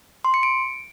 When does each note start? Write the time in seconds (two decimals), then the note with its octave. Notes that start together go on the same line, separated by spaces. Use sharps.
0.25 C6
0.34 C#7
0.43 D7